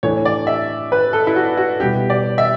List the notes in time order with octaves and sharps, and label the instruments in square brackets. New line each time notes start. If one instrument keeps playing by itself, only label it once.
[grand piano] A2 E3 A3 D4 [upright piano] C#5
[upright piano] D5
E5
B4
A4
E4
F#4
F#4
[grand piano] B2 G3 B3 E4 [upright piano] G4
[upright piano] D5
E5